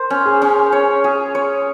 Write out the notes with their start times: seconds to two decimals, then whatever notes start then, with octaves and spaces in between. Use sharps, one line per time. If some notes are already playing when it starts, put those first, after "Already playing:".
Already playing: A#4 C5
0.10 C#4
0.26 G#4
0.42 C#4
0.72 C#5
1.04 G#4
1.35 C#5